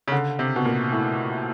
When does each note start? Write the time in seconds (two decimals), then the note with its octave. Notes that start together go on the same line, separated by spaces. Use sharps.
0.08 C#3
0.12 D3
0.39 C3
0.56 B2
0.65 A#2
0.92 A2